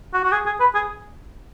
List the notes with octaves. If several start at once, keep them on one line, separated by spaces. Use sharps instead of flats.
F#4
F#4
G#4
G#4
B4
G#4